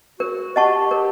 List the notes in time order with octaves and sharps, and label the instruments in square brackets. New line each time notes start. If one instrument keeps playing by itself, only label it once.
[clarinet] F#4 [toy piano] A#4
[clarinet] G4 [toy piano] D#5 F#5 A5 C#6
[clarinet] G4 [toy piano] A#4